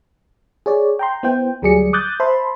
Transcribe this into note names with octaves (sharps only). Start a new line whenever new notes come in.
G#4 C#5 D5
G5 A#5 C6
B3 E4 C5 G5
D2 F#3 G3 G#4 D5 C#7
D6 D#6 F#6 G6 A6
C5 E5 A5 B5 C6